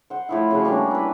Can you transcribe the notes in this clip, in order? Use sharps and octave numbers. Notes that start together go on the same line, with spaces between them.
C5 F#5
A2 F3 E4
C#3 F3 F#4
G3 A#3 C#4 D4
E4 B4